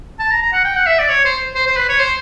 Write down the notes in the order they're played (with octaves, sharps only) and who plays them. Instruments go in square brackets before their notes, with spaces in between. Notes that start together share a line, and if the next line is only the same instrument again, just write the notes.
[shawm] A5
A#5
A#5
F#5
G5
F#5
E5
D5
C#5
C5
C5
C5
B4
C#5
C5